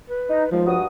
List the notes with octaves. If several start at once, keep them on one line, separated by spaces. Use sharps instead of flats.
B4
D#4
D#2 F3 G#3
G2 F#4 D#6